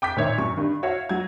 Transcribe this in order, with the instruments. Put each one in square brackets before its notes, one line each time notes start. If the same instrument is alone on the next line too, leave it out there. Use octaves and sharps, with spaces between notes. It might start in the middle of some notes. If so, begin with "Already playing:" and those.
[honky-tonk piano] G5 D6 G6 B6
A#2 D#3 C#5 E5
F#2 C#6
G2 D#3
F#4 C#5 E5 F5
F#3 F#4 G#6